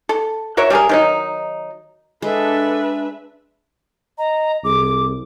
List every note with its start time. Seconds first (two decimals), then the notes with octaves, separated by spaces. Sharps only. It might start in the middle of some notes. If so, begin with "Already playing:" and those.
0.09 A4
0.57 F#4 A#4 C#5 E5
0.70 G3 A3 G#4 A#4
0.89 D#3 F#3 D#4
2.22 G#3 D4 A4 B4 E5
4.18 D#5 A#5
4.64 C2 G#4 D6